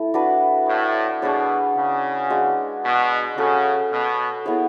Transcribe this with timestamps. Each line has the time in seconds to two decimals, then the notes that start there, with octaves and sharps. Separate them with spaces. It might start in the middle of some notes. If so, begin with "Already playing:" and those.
Already playing: A3 E4 A4
0.14 D4 F#4 B4
0.68 A2
1.22 B2 D4 G#4 C#5
1.76 C#3
2.30 G#3 D4 F#4
2.84 B2
3.38 C#3 C#4 F#4 A4
3.92 B2
4.45 B3 E4 G#4 C#5